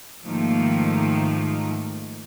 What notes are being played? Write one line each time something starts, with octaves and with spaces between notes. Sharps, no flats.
G#2 D#3 F3 A3 A#3